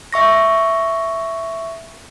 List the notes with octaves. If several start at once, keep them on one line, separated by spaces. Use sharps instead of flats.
E5 C#6 A#6